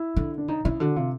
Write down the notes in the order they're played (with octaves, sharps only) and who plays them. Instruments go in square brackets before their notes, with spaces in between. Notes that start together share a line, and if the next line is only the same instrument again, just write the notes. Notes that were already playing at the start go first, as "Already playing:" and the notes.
Already playing: [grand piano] E4
[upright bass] D3
[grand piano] D4
[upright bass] C#3 [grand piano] D#4
[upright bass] C#3 [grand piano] E4
[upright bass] D3 [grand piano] F#4
[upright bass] C3 [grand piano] F4